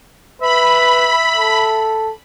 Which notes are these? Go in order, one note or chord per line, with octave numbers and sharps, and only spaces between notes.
B4 E5 B5
A4